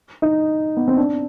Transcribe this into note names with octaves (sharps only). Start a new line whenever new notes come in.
D#4
B3
C4
D4